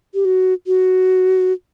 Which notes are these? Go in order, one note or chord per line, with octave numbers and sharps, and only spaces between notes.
G4
F#4
F#4